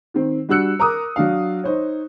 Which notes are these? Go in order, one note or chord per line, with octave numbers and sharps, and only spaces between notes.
D#3 C4
G3 D4 F#4 E6 F#6 C#7
A#4 A#5 D6 D#6
F#3 D4 F5
D#4 C5 C#5